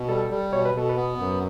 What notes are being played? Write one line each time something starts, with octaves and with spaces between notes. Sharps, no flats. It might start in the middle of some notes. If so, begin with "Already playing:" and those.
Already playing: B2
G3 A4
G3
B2 C#5
B4
B2 A4
B4
B3
F#2